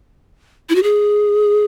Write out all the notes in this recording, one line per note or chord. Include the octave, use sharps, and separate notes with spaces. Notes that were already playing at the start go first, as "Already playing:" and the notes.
E4
F#4
G#4